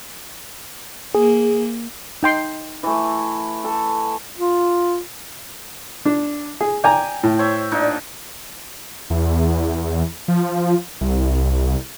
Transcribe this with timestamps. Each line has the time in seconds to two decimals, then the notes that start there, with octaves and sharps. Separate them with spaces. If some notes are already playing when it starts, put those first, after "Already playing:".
1.15 A#3 G#4
2.23 D#4 G5 C6
2.83 E3 A3
3.64 A4
4.38 F4
6.05 D4
6.61 G#4
6.84 D5 G5 G#5 A#5
7.23 A2
7.39 C5 C#5 E5
7.72 A#2 D4 D#4
9.10 E2
10.28 F3
11.01 C2